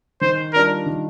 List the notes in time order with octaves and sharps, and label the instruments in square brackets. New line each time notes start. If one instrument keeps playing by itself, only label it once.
[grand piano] D#3 [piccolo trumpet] C5
[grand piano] G3 D4 F4 [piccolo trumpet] A#4
[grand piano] D#3